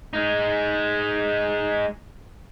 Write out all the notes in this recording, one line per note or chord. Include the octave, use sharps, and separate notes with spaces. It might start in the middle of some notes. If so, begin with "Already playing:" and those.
G#3 D#4